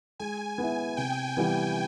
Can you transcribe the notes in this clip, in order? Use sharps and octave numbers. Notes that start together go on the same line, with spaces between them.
G#3 G#5
B3 E4
C3 G5
E3 G3 B3